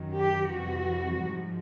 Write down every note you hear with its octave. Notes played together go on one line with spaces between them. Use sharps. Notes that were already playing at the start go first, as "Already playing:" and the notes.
Already playing: F#2 D#3 F#3
G4
F2 C3 E3 G3 F#4
G#2 F3